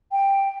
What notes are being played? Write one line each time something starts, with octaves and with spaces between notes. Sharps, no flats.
G5